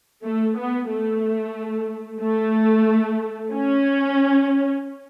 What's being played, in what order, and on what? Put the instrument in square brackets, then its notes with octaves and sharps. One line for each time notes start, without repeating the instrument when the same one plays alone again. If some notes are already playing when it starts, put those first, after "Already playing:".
[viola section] A3
B3
A3
A3
C#4